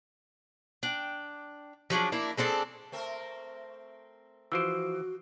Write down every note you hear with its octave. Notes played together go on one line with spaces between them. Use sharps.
D4 G5
F3 F#3 D4 G#4
A#3 D4 E4
G#3 C4 D4 A4
A3 C4 A#4
E3 F3 F#4 C5 E6 D7